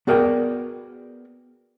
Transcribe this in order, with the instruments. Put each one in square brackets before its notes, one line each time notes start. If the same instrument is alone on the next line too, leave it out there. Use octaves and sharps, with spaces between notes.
[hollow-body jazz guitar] B3 F#4 G#4 A#4 D5 G5